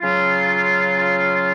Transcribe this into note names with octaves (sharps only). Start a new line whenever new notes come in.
C#3 F#3 C#4 F4